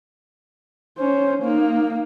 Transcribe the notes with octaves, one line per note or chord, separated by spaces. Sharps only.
C#4 C5
A#3 D#4